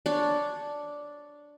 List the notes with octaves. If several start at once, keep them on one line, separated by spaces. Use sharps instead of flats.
D4 C#5